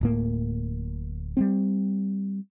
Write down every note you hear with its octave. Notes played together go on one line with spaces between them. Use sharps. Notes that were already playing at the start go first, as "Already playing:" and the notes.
D1 A2 A#3
G3 B3 C4